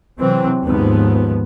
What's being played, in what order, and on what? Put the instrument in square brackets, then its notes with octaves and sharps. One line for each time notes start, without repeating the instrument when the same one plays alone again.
[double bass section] C3 E3 F#3 C4
D#2 G#2 F3 B3